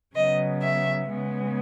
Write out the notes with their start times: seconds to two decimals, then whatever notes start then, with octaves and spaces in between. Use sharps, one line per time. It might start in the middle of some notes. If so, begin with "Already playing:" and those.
0.15 C#3 F#3 B3 D#5
0.61 E5
1.07 C#3 G#3 B3